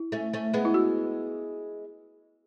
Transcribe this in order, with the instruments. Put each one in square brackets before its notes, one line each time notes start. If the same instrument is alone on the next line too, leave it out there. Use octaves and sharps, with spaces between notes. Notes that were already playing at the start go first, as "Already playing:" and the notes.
Already playing: [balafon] E4
[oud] A3 C#4
A3 C#4
G#3 B3
[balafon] E4
F#4